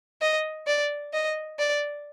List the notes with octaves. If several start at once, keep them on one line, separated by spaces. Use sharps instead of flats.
D#5
D5
D#5
D5